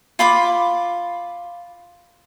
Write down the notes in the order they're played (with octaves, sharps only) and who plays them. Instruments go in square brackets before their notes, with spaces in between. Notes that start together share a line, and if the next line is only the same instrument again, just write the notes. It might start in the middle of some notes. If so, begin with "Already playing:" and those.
[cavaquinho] F4 B5 D6